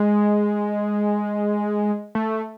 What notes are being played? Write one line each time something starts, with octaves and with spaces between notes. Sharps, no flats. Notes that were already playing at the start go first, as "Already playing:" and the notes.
Already playing: G#3
A3